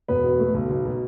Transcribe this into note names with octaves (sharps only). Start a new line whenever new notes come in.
E1 B3 B4
B2
A3
B1
B1
B2